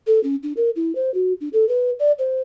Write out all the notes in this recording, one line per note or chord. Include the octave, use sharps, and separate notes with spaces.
A4
C#4
D4
A#4
E4
C5
F#4
D4
A4
B4
D5
C5